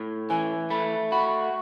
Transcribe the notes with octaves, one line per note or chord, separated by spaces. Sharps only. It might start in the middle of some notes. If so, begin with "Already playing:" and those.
Already playing: A2
E3 G#5
A3 B5
F#4 B5